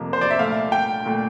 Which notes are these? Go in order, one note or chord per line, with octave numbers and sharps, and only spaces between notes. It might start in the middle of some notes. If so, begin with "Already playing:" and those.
Already playing: F2 C3 F3 A#3
C5
D5
E5
C2 A#2 A3 F5
G5
A#2 A3